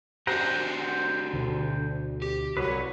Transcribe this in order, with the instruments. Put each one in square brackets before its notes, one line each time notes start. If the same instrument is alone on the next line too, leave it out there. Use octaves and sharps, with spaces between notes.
[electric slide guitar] D4 F#4 G4 [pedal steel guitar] C5 F#5 A#5
[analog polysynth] D2 [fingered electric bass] B2 D3
[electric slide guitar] G4
[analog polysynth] C2 F#3 C#5 [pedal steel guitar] B4